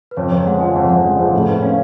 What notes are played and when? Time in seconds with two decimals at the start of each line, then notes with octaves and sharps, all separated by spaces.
0.11 B4
0.17 F2 C#5
0.32 F2 D5
0.46 G#3 F#5
0.60 F3 G#5
0.75 F2 F#5
0.89 F2 F#5
1.05 G#3 D5
1.19 F3 G#4
1.33 A2 A4
1.48 A2 B4
1.62 C#4 F5